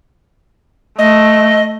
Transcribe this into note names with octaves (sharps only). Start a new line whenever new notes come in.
A3 D#5